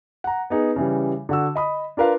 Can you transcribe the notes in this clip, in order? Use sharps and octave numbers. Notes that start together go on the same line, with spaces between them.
F#5 A#5
B3 D#4 G#4
C#3 E3 G3
D3 F#4 E6
D#5 B5 D#6
D4 F4 A#4 B4 F5